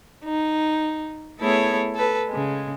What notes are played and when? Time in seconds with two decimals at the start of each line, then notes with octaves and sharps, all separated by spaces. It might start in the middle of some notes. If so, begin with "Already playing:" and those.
0.24 D#4
1.39 A3 B3 E4 G#4 A4 C#5
1.95 A4 B4
2.29 C#3 G#3